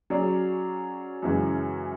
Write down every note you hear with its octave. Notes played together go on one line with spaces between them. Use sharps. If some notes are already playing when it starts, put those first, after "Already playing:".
F#3 C#4 G#4 D5
F#2 C#3 E3 G#3 C#4